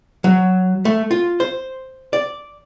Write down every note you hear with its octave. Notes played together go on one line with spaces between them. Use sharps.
F#3
A3
F4
C5
D5